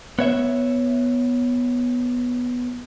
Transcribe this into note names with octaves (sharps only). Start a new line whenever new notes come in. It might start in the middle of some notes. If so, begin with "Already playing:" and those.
B3 C#5 E5